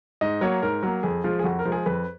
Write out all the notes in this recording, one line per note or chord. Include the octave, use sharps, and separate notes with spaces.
G#2 D#5
F#3 A#3 C#5
G#2 A#4
F#3 A#3
F2 G#4
F3 G#3 F4
G#4
F2 F#4
A#4
F3 G#3
G#4
F2 B4